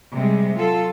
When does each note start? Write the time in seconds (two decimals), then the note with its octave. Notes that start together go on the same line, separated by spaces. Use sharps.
0.15 C3 G3 G#3
0.56 F#3 F4 A4